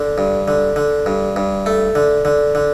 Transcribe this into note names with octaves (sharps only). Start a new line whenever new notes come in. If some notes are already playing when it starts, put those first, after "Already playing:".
Already playing: D3
G2
D3
D3
G2
G2
A3
D3
D3
D3